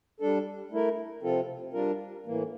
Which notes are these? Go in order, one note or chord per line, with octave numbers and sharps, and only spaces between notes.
G3 D4 A4
A3 E4 A#4
C3 F3 C4 F4 A4
G3 D4 F4 A#4
A2 E3 A#3